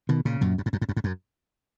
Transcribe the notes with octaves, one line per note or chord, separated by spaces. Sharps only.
B2 D#3
A#2 C#3
F#2 A#2
F#2
G#2
F#2
G#2
F#2
G#2
F#2